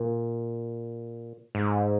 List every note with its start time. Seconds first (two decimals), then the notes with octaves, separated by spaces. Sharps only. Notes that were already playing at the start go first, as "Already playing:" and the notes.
Already playing: A#2
1.55 G#2